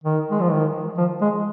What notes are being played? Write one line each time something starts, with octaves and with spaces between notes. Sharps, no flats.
D#3
G#3
F3
D#3
F3
G#3